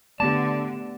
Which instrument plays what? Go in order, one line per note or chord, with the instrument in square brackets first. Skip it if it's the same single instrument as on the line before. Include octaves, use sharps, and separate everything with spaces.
[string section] D3 [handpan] A3 B3 G4 [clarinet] D5 [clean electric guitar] A5